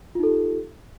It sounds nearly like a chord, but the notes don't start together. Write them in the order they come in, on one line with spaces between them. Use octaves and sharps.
F4 D#4 A4 G4